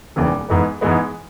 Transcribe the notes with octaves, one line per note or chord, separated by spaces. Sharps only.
E1 D#2 C#3 E3
G#2 E3 G#3 B3
G#2 E3 G#3 B3